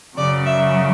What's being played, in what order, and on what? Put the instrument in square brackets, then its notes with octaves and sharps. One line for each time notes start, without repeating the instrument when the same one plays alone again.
[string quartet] F#2 C#3 F#3 D5
E5